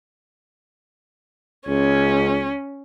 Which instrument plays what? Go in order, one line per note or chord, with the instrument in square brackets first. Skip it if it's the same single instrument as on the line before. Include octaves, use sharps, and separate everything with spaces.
[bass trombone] C#2 [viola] C#4